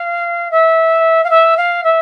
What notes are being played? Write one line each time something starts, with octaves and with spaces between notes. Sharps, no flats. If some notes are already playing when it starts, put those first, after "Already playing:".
Already playing: F5
E5
F5
E5
F5
E5